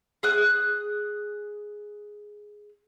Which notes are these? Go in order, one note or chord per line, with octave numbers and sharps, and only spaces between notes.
G#4 D#6 F#6